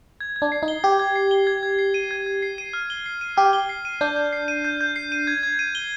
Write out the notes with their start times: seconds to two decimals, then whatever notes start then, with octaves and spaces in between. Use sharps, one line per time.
0.20 G#6
0.36 G#6
0.42 D4
0.52 C7
0.63 D#4
0.68 G7
0.84 G4 G#6
0.99 G#6
1.15 C7
1.31 G7
1.47 G#6
1.63 G#6
1.79 C7
1.94 D#7
2.11 G#6
2.26 G#6
2.42 C7
2.58 D#7
2.73 F6
2.90 G7
3.06 C7
3.21 D#7
3.37 G4 F6
3.53 G7
3.69 C7
3.85 D#7
4.01 D4 G6
4.16 G6
4.33 C7
4.48 D#7
4.65 G6
4.81 G6
4.96 C7
5.12 D#7
5.27 G#6
5.43 G#6
5.59 D#7
5.75 G7